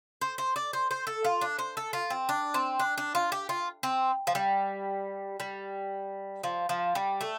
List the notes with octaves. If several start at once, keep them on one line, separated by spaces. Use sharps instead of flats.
C5
C5
D5
C5
C5
A4
F4
D4
C5
A4
F4
C4
D4
C4
D4
D4
F4
G4
F4
C4
F3
G3
G3
F3
F3
G3
A3